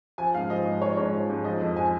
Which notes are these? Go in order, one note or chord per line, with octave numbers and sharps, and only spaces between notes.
F3 G#5
G#2 F5
F3 D#5
G#2
F3 C#5
G#2 C#5
F3
G#2
F3 D#5
F2
F3 G#5